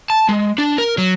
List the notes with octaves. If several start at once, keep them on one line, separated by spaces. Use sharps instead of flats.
A5
G#3
D4
A#4
F#3